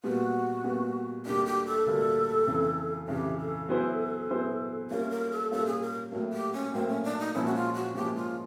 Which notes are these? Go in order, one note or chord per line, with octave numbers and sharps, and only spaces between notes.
A#2 G3 B3 F#4
A#2 G3 B3
D2 D3 G3 A#3 D4 G4
G4
A4
D2 D3 G3 A#3 D4
F2 C#3 E3
F2 C#3 E3 G4
A4
F#3 B3 E4 G#4 C5
F#3 B3 E4 G#4 C5
G3 A#3 C#4 F4 A#4
A#4
A4
G3 A#3 C#4 F4 A4
G#4
A#4
A2 F#3 A#3
G4
C#4
A2 F#3 A#3 C4
C#4
D4
D#4
A#2 F3 G#3 C#4 E4
F#4
F4
F#4
A#2 F3 G#3 C#4 G4
F4